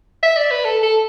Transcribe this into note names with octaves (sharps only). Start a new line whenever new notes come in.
E5
D5
B4
A4
A4